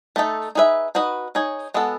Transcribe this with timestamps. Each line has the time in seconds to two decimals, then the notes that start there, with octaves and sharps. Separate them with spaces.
0.16 A3 D#4 A4
0.55 D#4 G#4 B4 E5
0.95 D#4 F#4 B4 D#5
1.35 D#4 G#4 C#5
1.74 G#3 B3 F#4 A4